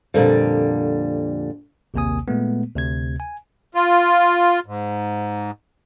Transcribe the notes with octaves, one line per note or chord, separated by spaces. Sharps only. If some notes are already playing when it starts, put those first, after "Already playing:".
F2 A#2 D3 G3
A#1 D#2 C3 A#3 G#5 D#6
A#2 G#3 A3 B3
D2 C3 G#6
G#5
F4
G#2